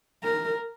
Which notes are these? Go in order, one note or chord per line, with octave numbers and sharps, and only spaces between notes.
A#4